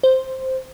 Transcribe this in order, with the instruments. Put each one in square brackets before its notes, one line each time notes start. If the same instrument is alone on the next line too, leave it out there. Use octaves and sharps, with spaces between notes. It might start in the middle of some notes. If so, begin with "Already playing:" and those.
[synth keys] C5